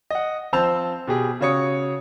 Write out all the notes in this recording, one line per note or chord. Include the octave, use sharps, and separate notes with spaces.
D#5 F#5
F3 C4 C5 A5 E6 F7
B2 G4 G#4
C#3 F#4 C#5 D#6 C#7